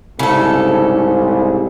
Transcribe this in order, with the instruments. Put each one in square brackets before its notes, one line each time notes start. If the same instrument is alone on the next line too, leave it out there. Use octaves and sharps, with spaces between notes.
[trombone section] C2 G#2 [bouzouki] C#3 A4